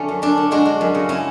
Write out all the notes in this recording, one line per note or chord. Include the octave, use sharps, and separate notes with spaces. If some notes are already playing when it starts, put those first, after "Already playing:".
Already playing: D3 F#3 A3 C#4
F#2
F#2 D4
D3
G#3 D4 F#4
G#3
F#2
C#3
C#4 E4